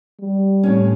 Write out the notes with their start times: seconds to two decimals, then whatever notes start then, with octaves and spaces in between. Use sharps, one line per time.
0.20 G3
0.63 A2 C#4